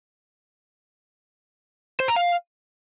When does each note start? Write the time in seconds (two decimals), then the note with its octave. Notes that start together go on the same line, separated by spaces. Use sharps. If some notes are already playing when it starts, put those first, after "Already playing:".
2.00 C5
2.08 A#5
2.16 F5